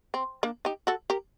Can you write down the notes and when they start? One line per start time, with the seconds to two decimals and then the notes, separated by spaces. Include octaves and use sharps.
0.14 C4
0.43 A#3 D4
0.65 D#4 G4
0.87 F#4 A4
1.10 G4 A#4